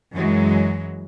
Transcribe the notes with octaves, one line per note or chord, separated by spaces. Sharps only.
F#2 E3 F#3 G#3